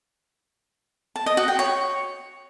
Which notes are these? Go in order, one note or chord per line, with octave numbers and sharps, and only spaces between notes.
A5
D#5
F#4
G5
C#5